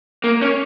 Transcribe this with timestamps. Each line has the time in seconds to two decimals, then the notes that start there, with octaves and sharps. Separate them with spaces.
0.24 A#3
0.42 C#4